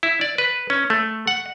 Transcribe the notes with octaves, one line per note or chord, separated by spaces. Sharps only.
E4
D5
B4
C#4
A3
F#5